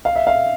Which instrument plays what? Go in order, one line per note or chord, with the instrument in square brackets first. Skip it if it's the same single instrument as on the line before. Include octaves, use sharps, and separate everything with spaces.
[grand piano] F5
E5
F5